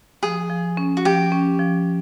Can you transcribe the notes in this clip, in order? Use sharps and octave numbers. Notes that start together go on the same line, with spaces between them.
F3 G#4
F3
C#4
F#4
F3 G4
C#4
F3